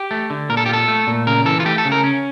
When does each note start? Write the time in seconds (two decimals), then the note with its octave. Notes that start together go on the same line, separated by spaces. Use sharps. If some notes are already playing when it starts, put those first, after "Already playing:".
Already playing: G4
0.11 A3
0.30 D3
0.49 A#2 A#4
0.57 A4
0.66 G4
0.69 F4 A4
0.88 A3
1.07 A#2
1.27 C#3 A#4
1.45 E3 A4
1.60 F4
1.65 A3 G4
1.78 A4
1.85 C#3
1.92 A#4
2.04 C#4